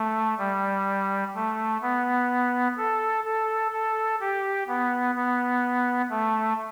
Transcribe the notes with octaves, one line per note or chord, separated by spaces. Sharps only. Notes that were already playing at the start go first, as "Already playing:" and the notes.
Already playing: A3
G3
A3
B3
A4
A4
A4
G4
B3
B3
A3